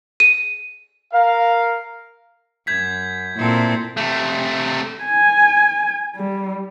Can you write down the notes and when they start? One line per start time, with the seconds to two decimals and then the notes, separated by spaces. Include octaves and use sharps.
0.20 D#7
1.13 A#4 F5
2.67 F#2 G6 G#6 B6
3.37 A#2 C4 E4 A4 A#4
3.97 C3 A3
5.04 G#5
6.16 G3